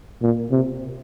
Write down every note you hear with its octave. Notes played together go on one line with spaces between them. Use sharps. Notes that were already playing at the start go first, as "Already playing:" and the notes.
A#2
C3